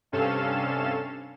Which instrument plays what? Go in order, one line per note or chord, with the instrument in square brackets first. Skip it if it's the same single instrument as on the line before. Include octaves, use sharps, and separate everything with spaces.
[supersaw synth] G2 C3 C#4 A4 F5 E7